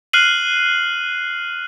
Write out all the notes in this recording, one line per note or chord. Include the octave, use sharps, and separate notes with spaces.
F6 F#6 C7 D#7 F#7